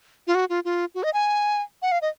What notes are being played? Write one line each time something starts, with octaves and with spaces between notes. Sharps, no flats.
F4
F#4
F4
F4
F#4
D#5
G#5
F#5
F5
D#5